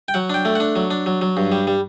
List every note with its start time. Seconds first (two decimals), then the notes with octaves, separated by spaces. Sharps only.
0.08 G5
0.14 F#3 F#5
0.30 D4 G5
0.45 A3
0.55 D4 F#5
0.76 F#3
0.91 D4
1.06 F#3
1.21 F#3
1.37 G2
1.52 G3
1.67 G3